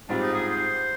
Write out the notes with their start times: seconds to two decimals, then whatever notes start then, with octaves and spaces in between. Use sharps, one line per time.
0.09 G#2 G3 C4 D4 F4
0.22 D#4
0.34 G#4
0.47 C5